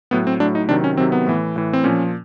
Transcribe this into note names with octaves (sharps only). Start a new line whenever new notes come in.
A2 F#3 B3
C4
A2 F#3 D4
D#4
C3 D#3 F#3 D4
C#4
C3 D#3 F#3 C4
B3
A2 E3
A2 E3
C4
A#2 F3 C#4